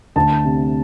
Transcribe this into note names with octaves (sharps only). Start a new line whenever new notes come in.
D2 A5
C3